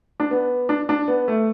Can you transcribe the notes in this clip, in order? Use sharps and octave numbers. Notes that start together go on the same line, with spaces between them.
D4
B3
D4
D4
B3
A3